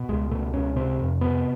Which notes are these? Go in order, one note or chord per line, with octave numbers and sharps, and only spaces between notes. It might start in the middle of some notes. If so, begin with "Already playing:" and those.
Already playing: B2
C#2 G#3
B2 A3
C#2 C#4
C3 C4
F2
C3 B3